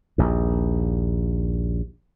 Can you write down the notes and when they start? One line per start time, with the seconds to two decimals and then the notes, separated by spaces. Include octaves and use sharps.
0.18 A#1 D#2